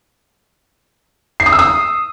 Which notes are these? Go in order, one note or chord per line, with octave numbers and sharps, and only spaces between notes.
C7
D#6
E6
D#6